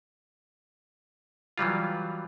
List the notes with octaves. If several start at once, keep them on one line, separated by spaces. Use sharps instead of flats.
E3 F#3 G3 F4